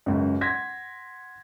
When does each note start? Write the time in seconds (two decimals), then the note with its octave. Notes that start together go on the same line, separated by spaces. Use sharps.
0.06 C#2 F#2
0.41 F#5 C6 G#6 A#6 B6